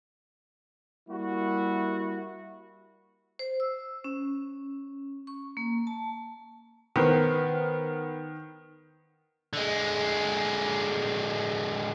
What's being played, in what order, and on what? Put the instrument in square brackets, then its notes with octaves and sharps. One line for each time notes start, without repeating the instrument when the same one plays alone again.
[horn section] G3 A#3 E4 F#4
[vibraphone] C5
E6
C#4
C#6
A#3
A5
[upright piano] D#3 [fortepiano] B3 A#4 C5
[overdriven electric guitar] D3 G#3